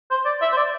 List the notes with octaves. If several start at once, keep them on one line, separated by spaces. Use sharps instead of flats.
C5
D5
E5
C5
D5